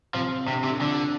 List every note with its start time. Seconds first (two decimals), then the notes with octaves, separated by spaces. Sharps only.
0.14 C3 F3 C4
0.48 C3 D4
0.58 C4
0.64 C3
0.67 D3 D4
0.81 D3 F3 F4